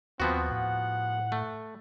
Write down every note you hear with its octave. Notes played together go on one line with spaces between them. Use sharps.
D#2 F3 B3 C4 F#4
A2 F#5
A3